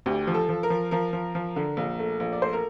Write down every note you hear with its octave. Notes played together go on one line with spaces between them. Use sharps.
D2 G4
F3
A4
F3
A#4
F3
F3 A#4
F3
F3
D3
A#1
A3
A#1
D5
A3 C5
A#4